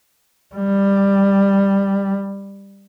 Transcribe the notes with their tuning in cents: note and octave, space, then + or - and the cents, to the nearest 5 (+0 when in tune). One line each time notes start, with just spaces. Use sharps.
G3 +10